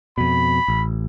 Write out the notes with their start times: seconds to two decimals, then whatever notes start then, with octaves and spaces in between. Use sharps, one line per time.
0.18 F2 B2 B5
0.68 A1